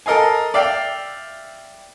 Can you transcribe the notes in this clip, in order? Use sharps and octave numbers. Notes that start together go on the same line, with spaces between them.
A4 A#4 D#5 F5 G#5
D5 E5 F5 G5